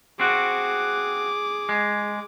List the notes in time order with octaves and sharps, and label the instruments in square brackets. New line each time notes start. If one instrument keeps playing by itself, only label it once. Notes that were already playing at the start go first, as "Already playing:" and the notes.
[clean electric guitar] C4 F#4 [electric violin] G#4 D6
[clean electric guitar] G#3